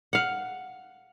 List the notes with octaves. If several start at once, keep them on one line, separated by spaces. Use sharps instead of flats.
F5 F#5